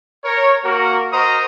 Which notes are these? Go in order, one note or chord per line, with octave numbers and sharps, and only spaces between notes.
A#4 C#5
A#3 F#4 A#4
F#4 A#4 C5 D#5 A#5 D#6